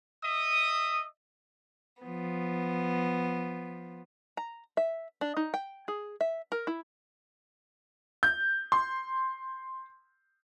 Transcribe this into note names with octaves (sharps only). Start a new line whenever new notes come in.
D#5 E5 D#6
F3 B3
A#5
E5
D4
D#4
G5
G#4
E5
A#4
E4
G6
C6